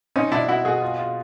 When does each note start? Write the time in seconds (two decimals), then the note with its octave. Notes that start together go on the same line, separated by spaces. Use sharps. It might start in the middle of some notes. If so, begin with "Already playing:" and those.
0.16 C4 C#4 D#4
0.31 B2 D4 E4
0.48 B2 E4 F#4
0.65 B2 F#4 G#4
0.82 F4
0.99 F4